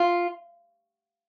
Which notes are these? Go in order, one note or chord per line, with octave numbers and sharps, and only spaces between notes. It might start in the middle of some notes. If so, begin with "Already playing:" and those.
Already playing: F4